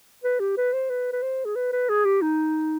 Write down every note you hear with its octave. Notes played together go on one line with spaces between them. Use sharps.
B4
G4
B4
C5
B4
B4
C5
G#4
B4
B4
G#4
G4
D#4